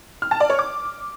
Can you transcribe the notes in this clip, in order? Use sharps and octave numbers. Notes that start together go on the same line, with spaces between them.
F6
A5
D5
C#5
D6